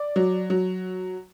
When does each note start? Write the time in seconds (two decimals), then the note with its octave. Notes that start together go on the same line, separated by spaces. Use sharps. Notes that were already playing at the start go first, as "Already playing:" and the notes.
Already playing: D5
0.16 F#3
0.50 F#3